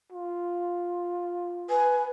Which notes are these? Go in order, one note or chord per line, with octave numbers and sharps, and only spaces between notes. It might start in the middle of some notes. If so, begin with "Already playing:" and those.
F4
B4 G#5